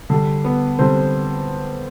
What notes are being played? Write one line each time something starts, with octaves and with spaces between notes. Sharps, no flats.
D3 G3
B3 B4
D3 G3 C4 C5